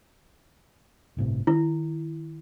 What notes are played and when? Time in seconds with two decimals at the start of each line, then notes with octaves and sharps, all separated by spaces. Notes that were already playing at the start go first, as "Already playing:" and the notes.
1.17 G1 A2 C3
1.47 D#3 E4